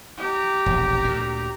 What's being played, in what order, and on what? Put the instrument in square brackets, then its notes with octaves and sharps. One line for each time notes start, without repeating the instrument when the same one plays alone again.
[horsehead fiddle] G4 A#5
[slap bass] E1 A#1
D2 A#2